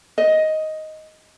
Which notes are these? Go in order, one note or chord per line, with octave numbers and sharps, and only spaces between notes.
D#5